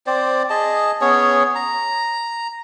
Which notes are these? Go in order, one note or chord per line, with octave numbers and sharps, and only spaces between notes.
C4 C5 D5
G#4 D#5 A5
B3 C#4 G#4 C#5
A#5